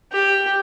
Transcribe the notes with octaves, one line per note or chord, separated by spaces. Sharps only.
G4